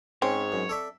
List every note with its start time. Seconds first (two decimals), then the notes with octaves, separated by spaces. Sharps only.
0.22 G#2 C4 C#4 C#5
0.52 F#2
0.69 A4 D5 E5